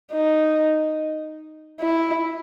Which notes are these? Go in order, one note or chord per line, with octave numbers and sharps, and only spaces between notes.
D#4
E4